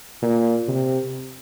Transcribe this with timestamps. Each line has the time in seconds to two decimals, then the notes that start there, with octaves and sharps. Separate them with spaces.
0.22 A#2
0.67 C3